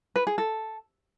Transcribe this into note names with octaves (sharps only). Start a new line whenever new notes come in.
B4
G#4
A4